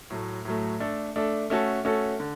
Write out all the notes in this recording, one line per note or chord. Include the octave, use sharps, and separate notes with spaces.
A2 F#3 A3
A2 F#3 A3
A3 D4 A4
A3 D4 A4
A3 C#4 F#4 A4
A3 C#4 F#4 A4
D3